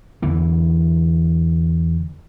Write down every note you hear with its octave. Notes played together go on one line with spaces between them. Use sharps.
E2 D3 E3